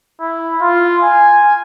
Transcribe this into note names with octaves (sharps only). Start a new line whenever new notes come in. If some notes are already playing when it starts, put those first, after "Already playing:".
E4
F4
G#5